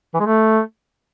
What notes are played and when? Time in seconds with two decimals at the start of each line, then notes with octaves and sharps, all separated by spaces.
0.14 E3
0.20 G#3
0.26 A3